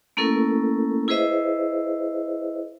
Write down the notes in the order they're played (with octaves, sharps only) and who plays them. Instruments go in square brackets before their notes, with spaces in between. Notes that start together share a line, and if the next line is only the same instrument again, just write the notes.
[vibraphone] A3 A#3 C#4 E4 A4 A#4
E4 G#4 B4 C5 D#5 E5